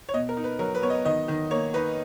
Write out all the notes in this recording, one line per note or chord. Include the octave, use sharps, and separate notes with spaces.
C#5
B2 D#5
A#4
D#4
B4
F#3 A#4
B4
B3 C#5
D#5
D#3 D#5
D#3
A#3 C#5
D#4 B4